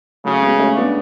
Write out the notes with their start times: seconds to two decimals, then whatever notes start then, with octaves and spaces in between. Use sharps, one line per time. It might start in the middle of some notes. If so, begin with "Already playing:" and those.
0.24 C#3 F#3 A3
0.42 G#3 B3
0.59 A3 C#4
0.77 B3 D4